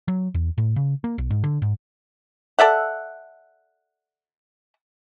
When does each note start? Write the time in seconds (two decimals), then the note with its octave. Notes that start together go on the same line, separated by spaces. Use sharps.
0.08 F#3
0.34 E2
0.58 A2
0.76 C#3
1.04 A#3
1.18 B1
1.30 G#2
1.44 D3
1.62 G#2
2.59 A4 D5 E5 F#5